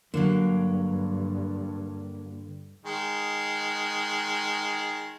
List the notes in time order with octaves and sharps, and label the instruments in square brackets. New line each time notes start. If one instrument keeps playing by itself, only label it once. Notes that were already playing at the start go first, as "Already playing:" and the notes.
[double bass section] G2 [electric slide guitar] D3 [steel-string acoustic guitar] F#3 A#3
[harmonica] D#3 G#3